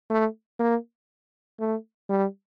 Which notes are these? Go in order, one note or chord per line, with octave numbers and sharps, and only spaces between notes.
A3
A#3
A3
G3